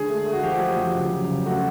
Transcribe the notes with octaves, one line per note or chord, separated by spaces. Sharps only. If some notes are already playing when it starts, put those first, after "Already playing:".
Already playing: D3 G#3 G#4
A3
A3
F#4
F3 G4
F3
F2
C#3
F#3
C#3
A3 F#4